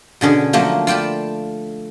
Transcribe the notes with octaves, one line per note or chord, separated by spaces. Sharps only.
B2 D3 C#4 G#4
F3 F#3 A3 A#3 C5
F4 D5 G5 A5 B5